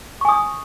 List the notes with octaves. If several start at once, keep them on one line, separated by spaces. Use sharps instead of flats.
G#5 C#6 D#6